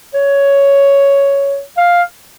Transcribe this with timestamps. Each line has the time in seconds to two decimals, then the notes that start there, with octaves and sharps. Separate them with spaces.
0.14 C#5
1.77 F5